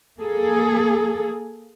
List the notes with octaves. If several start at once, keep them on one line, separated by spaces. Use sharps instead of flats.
A#3 G#4 A4